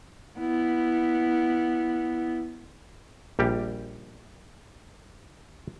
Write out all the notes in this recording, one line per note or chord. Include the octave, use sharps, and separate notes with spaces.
B3 E4
A#1 G3 G4